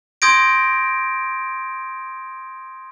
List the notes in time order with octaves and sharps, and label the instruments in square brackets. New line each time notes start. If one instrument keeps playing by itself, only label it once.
[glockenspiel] C6 D#6 G6 G#6 A#6 D7